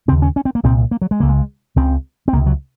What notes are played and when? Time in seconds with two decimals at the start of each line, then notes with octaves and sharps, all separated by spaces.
0.08 C#3 C4
0.11 D#2
0.22 C#4
0.36 C#4
0.45 C4
0.55 A#3
0.63 C2 A#2 C4
0.91 A#3
1.02 F#3
1.11 G#3
1.20 C#2 C#3 A#3
1.29 G#3
1.76 C#2 C#3 C4
2.28 C4
2.33 C#2 A#3
2.37 C3
2.46 F#3